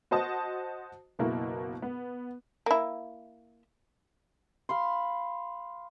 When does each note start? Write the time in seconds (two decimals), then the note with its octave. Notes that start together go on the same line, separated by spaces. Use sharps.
0.11 F#4 C5 D#5 A5 D#6
1.19 F#1 B2 A#3 E4
1.82 B3
2.66 A#3 E4
4.69 F5 B5 C6